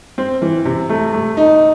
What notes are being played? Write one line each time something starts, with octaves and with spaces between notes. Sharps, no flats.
C4
E3
C3
A3
A3
D#4